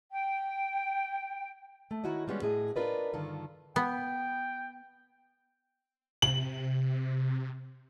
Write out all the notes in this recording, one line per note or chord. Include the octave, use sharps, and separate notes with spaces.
G5
A3
D#3 E4 F#4 C#5 D#5
G3 G#3 B3 C#4
A2 G#4 D#5
D4 F4 A#4 B4 D5 D#5
G2 D3 D#3 F4 A4
B3 G5
C3 F#7